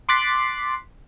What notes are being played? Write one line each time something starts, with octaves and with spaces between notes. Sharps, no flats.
C6 D6 F#6 A6 B6 C7